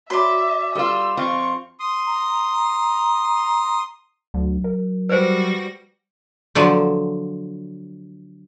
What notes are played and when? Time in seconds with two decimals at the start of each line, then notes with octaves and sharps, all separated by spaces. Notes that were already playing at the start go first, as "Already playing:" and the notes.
0.10 F#4 C#5 D5 E5 B5 C6
0.75 G3 F4 G4 A4 B4 E6
1.17 F2 C4 F4 C#6
1.80 C6 D#6
2.07 A#5
4.34 D2 F#3
4.64 A#4
5.09 G3 F#4 B4 C5 A#6
6.55 D3 F3 F#3